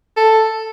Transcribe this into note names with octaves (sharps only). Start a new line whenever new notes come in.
A4